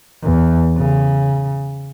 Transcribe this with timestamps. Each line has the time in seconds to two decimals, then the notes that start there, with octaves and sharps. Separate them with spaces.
0.23 E2
0.77 C#3